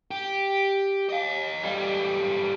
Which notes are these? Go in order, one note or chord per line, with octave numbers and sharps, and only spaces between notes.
G4
D#5 F5
E2 G3